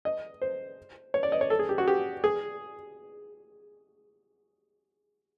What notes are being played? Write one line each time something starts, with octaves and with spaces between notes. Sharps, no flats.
D#5
C5
C#5
D5
D#5
C#5
A4
G#4
G4
F#4
G4
G#4